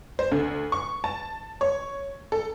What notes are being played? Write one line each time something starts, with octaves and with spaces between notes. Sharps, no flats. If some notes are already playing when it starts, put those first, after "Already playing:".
C5
D2
C#6
A5
C#5
A4